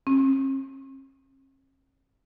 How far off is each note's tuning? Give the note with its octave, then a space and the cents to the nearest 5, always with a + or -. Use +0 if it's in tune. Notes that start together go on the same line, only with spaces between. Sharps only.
C#4 -45